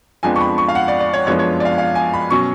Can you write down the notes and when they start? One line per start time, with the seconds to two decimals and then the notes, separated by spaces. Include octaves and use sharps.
0.23 F2 F3 G#3 B3 D4 G#5
0.36 C#6
0.41 B5
0.58 C#6
0.69 F5
0.75 F#5
0.88 D5
1.00 D5
1.14 C#5
1.26 F#2 F3 G#3 B3 D4 C#5
1.39 C#5
1.60 D5
1.65 F5
1.78 F5
1.95 G#5
2.14 B5
2.31 B2 F#3 C#4 C#6